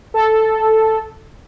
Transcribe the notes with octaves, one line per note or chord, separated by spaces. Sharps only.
A4